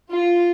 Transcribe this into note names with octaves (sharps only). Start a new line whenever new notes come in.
F4